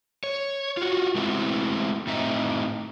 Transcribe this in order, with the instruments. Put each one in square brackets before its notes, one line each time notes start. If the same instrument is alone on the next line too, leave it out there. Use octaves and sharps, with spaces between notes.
[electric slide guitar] C#5
F4 F#4
G#3 A3 B3 C4 D#4 E4
A2 C4 D#4 E5